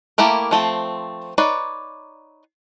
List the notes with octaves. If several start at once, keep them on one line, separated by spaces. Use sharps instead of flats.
A3 A#3 E4 G4 A#4
F3 A3 C4
D#4 B4 C#5 D5